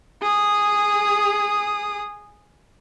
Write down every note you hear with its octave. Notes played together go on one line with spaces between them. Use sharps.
G#4 D#6